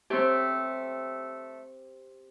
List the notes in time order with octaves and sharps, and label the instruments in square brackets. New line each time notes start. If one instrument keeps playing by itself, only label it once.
[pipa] F#3 A3 [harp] C4 G4